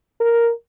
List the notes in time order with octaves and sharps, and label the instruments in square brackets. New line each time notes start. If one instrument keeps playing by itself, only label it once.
[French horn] A#4